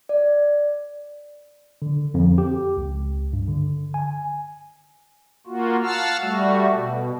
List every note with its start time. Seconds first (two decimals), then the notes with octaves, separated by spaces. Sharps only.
0.09 D5
1.82 D3
2.14 F2
2.38 G4
2.77 C#2
3.33 G2
3.48 D3
3.94 G#5
5.47 A#3 F4 F#4
5.83 F5 F#5 A5 E6 F6
6.20 G3 A3 F#4
6.74 B2